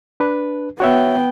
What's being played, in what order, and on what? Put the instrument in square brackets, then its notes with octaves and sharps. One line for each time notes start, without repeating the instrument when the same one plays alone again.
[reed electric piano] D4 B4
[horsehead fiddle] B3 G5 [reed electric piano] F#4 C#5 E5